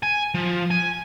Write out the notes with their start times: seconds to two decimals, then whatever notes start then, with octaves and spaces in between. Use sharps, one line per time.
0.03 G#5
0.34 F3
0.71 G#5